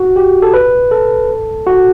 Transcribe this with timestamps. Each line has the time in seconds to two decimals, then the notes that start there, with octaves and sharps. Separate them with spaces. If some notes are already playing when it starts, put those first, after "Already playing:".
Already playing: F#4
0.16 G4
0.42 A4
0.54 B4
0.91 A4
1.67 F#4